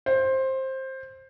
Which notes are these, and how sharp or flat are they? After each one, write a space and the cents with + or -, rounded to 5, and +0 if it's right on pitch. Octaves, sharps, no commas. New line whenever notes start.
C5 +15